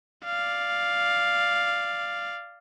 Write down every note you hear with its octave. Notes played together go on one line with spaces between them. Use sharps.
D5 F5